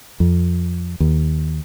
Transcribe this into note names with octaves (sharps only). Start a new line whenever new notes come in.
F2
D#2